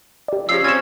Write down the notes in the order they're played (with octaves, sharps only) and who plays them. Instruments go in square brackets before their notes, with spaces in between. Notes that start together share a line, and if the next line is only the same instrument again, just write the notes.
[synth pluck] G4 D5
[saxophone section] C#3 F3 [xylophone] E6 C7
[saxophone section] C4 C#4 [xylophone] G#6 E7